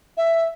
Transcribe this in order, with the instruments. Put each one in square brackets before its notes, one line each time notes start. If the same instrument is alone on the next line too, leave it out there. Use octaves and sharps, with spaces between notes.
[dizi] E5